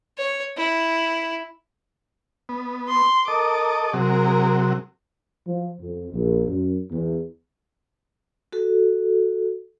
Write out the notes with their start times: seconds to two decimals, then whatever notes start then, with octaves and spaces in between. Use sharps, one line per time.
0.18 C#5
0.57 E4
2.49 B3
2.89 C6
3.28 A4 A#4 D#5 D6
3.93 C3 F#3 G#4 A#4
5.47 F3
5.80 F2
6.13 A#1
6.48 F#2
6.91 E2
8.52 F#4 A4